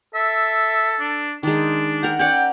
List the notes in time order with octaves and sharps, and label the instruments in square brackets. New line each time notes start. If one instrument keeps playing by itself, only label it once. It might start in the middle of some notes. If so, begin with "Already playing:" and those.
[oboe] A4 [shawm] E5
[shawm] D4
[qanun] D#3 G#3 [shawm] D4
[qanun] A#4 F#5 [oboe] G5
[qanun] C#4 D5 F#5 [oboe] G5